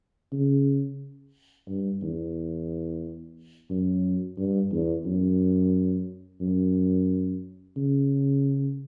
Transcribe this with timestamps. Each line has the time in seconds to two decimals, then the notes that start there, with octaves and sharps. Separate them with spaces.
0.32 C#3
1.68 G2
2.02 E2
3.70 F#2
4.37 G2
4.72 E2
5.06 F#2
6.40 F#2
7.77 C#3